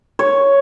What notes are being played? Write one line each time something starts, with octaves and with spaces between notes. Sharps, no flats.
C#5